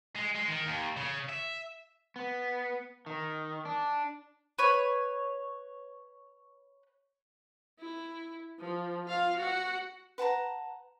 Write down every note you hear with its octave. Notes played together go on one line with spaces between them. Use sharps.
G#3
G#3
D#3
D#2
C#3
E5
B3
D#3
D4
B4 C#5
E4
F3
F4 F5
F#4 F#5
B4 F#5 A5 A#5